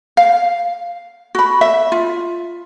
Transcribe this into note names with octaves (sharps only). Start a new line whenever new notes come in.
F5
F#4 B5
E5
F4